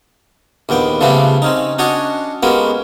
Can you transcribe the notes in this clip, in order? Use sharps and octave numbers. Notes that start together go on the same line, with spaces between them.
A#1 D#2 B3 G5
C#3 F3 G3 A3 B3 G4
C4 C#4 D#4
C#4 D4 F#4 C#5 D#5
G#3 A#3 B3 C#4 F#4 G4